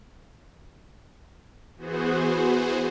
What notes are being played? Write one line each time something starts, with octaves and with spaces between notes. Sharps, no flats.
E3 B3 F#4 G#4 C5